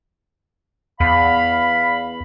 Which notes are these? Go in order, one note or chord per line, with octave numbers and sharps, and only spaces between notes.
E2 F5 B5